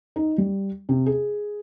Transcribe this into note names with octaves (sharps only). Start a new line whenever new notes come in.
D#4
G3
C3
G#4